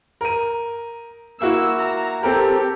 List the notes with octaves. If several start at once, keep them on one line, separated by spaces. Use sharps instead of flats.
A#4 D#7
A#3 E4 F#4 E6
A#5
C4 G4 A4 A#4